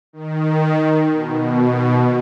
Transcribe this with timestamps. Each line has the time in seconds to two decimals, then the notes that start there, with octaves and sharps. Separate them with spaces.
0.13 D#3
1.11 B2